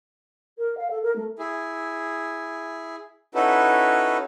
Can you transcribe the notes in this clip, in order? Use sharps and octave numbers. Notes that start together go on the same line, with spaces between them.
A#4
F5
A4
A#4
A3
E4 G#4
C#4 D#4 E4 F#4 A4 B4